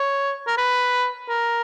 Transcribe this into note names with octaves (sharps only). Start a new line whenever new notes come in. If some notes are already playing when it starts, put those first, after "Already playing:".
Already playing: C#5
A#4
B4
A#4